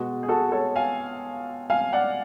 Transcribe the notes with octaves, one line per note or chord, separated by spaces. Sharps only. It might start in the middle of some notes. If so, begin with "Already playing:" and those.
Already playing: B2 G#3 F#4
G#4
F#4 A4
A4 C#5
F5 G#5
F5 G#5
D5 F#5